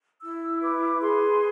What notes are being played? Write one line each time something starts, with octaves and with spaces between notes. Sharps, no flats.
E4 E6
B4 D6
G#4 C6